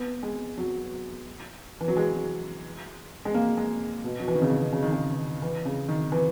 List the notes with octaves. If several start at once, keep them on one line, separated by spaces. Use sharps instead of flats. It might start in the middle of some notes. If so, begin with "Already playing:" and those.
Already playing: B3
G#3
F#3
E3
F#3
G#3
G#3
A#3
G#3
B2
F#3
E3
D#3
C#3
B2
C#3
D#3
C#3
E3
C#3
D#3
E3